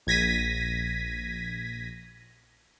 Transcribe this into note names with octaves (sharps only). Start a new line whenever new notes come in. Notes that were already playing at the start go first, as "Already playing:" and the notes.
A#1 G#6 A#6 B6 D#7